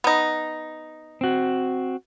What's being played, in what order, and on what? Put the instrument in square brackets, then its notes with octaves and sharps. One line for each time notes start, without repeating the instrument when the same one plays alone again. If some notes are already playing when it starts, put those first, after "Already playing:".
[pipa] B3 D#4
[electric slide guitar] C4 F#4